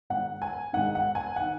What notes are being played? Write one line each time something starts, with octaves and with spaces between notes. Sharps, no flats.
G#2 D#3 F#5
G#5
G#2 D#3 F#5
F#5
G#5
D#3 F#5